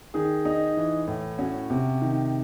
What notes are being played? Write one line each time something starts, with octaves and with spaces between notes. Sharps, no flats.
D#3 G#4
D#4
E3
A2
C#4 F#4
C3
D#3